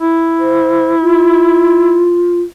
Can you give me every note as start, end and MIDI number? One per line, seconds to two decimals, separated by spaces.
0.01 2.10 64
0.39 0.93 72
1.01 2.40 65